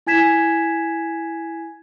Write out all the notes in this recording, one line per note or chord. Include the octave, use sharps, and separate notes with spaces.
E4 G#5 G#6 B6 E7